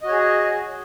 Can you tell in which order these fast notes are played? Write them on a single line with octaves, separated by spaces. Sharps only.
D#5 F#4 C#5 G#4